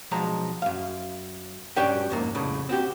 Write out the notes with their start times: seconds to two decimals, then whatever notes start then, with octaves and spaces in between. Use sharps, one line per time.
0.11 B1 F3 G#3 A#5
0.62 F#2 F5
1.76 G2 C#4 F#4 G4 D5 G5
2.10 F2 G#2 A#3
2.35 C2 F2 A2 C#3
2.69 C4 F#4 G4